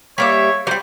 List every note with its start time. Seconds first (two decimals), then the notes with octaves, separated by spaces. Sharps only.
0.18 G3 A#3 C#5 E5
0.67 F#3 G3 C5